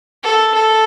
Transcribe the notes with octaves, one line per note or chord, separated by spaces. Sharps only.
A4
A4